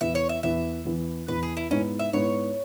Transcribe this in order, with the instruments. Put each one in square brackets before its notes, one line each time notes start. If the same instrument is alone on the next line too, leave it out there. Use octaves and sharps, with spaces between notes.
[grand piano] E2 E3 B3 [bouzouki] E5
[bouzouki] C#5
E5
[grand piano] E2 E3 B3 [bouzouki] E5
[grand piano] E2 E3 B3
[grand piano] E2 E3 B3 [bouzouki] B4
[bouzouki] G#4
E4
[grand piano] G#2 G#3 B3 E4 [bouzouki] C#4
[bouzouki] E5
[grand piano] G#2 G#3 B3 E4 [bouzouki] C#5